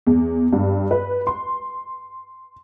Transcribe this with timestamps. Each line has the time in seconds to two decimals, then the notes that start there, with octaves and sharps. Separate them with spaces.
0.07 E2
0.53 G2
0.91 B4
1.27 C6